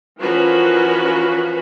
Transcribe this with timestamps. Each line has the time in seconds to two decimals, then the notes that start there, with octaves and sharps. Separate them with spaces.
0.19 E3 F3 C#4 F#4 A#4 B4